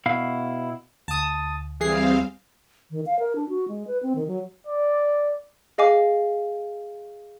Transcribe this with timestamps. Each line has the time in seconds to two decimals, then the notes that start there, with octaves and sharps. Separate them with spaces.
0.06 B2 E4 F5
1.08 D2 A5 D#6
1.80 E3 G3 C4 G#4 F5 C7
2.91 D#3
3.06 F5
3.19 A#4
3.36 D4
3.49 F#4
3.68 G#3
3.87 B4
4.03 C4
4.15 D#3
4.28 F#3
4.67 D5
5.78 G#4 D#5 F5 G#5 D6